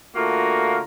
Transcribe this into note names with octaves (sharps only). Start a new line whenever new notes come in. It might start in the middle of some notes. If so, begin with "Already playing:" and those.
D3 A3 A#3 F4 F#4 A#4